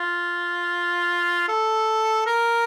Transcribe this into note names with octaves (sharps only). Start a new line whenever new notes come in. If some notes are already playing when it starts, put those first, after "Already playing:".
Already playing: F4
A4
A#4